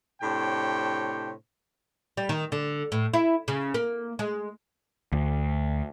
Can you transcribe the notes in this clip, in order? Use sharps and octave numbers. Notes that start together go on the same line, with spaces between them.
A2 C3 D4 C5 C#5 G5
G3
D#3
D3
A2
E4
C#3
A#3
G#3
D2